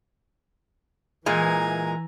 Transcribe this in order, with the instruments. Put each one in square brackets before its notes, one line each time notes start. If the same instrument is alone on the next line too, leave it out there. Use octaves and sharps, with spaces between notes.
[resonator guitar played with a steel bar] A#2 G#3 [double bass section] E3 [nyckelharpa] G#5 A#5